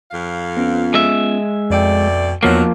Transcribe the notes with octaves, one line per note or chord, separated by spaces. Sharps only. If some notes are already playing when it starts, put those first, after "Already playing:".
F2 F5
B3 C#4 F4
G#3 E5
F2 B2 A3 D5 G5
E2 D#3 F3 F#3 A#3 B3 F6